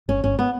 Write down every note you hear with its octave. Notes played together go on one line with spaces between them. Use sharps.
G1 C#4
G1 C#4
B3